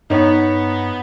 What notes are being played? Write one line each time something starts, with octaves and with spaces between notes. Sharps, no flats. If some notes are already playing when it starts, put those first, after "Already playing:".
G2 B3 D#4 C#5